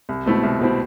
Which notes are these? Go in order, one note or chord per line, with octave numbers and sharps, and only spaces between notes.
C2
B2 A3 C4 E4
C2
B2 A3 C4 E4